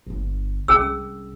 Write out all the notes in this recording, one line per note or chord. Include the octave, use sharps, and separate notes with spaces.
D1 G1
C2 C#4 G#4 E6